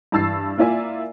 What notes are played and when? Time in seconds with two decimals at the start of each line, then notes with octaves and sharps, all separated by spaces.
0.12 G2 E3 A5 E6 A6 C7
0.58 A#3 E4 F4 D5 E5 G#5